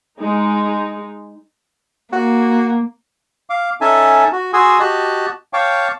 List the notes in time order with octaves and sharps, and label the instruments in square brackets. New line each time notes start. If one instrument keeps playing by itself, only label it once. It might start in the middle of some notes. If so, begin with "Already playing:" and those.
[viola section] G#3 D#4
[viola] A#3 [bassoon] F#4
[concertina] F5 D6
C#4 D#4 A4 E5 G#5 A5
F#4
F#4 G#4 G#5 C6 D#6 E6
F#4 G4 D#5 A5 F#6
C#5 F5 G5 A5 C#6 D6